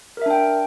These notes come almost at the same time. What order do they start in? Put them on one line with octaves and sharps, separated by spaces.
A#4 E5 D4 G5